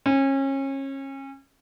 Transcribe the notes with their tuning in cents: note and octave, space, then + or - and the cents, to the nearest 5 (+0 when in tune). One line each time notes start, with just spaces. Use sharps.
C#4 -30